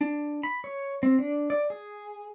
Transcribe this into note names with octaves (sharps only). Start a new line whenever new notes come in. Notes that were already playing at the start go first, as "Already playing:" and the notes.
D4
B5
C#5
C4
D4
D5
G#4